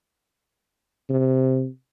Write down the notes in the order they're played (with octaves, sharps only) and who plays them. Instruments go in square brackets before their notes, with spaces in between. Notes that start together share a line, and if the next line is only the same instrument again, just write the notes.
[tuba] C3